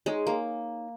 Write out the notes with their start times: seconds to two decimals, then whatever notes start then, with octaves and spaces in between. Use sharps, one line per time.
0.06 G#3 D#4 G#4 C#5
0.27 A#3